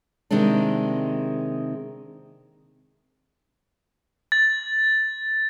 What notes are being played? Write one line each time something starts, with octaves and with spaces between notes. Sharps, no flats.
C3 D#3 G#3 A#3 C4 D4
A6